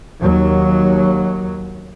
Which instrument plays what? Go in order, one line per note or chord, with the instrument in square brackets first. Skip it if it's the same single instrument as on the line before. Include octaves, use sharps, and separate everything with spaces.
[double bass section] D#2 F#3